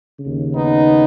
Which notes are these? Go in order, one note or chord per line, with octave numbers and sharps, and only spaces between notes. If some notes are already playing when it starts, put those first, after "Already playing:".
D#2 C#3
B3 D#4